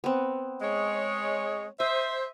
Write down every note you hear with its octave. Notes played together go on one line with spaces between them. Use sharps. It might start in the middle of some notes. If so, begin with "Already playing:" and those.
B3 C4
G#3 C#5
C5 D#5 E5